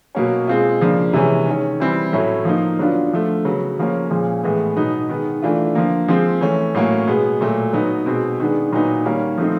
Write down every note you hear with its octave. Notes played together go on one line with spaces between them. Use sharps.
B2 F#3 A#3 C#4
B2 G#3 C4 F4
C#3 F3 A#3 D4
C3 E3 G#3 C#4
D#3 G#3 C#4
E3 G3 C4 E4
A2 F#3 A3 C#4 E4
F3 A#3 D#4
D3 F#3 B3 D4 F4
D3 F3 A3
C#3 F#3 B3
C#3 F3 A#3 C#4
A#2 F3 G#3 C#4
A2 E3 G#3 B3
B2 F#3 B3 D#4
D#3 G#3 B3
E3 A3 D4 F4
D3 F3 A#3
F3 G#3 C4
E3 A3 C#4
A2 F#3 A#3 C#4
B2 G#3 B3
A#2 F#3 A3
F#3 B3 D#4
B2 G#3 C4
D#3 G#3 B3 D4
A#2 F#3 B3 D#4
D#3 G3 A#3 C#4
F3 A3 C4 D#4